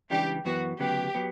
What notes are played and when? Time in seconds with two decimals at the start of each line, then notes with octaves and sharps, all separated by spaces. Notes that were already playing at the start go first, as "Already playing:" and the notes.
0.10 C#2 C#3 E3 G3 D4 G4
0.45 F#2 E3 B3 F#4
0.79 D2 C#3 F#3 B3 G4
1.15 F#3 B3